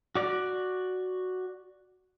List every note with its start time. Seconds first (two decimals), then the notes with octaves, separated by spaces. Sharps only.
0.15 F#4 D5